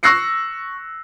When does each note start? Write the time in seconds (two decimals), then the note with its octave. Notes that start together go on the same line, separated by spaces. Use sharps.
0.03 C#6 E6 F#6 A#6 C7 C#7